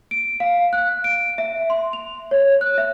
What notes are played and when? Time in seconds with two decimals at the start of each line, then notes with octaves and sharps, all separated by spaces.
0.11 D7
0.40 F5
0.73 F#6
1.04 D7
1.38 E5
1.70 C6
1.93 F7
2.31 C#5
2.61 F#6
2.78 E5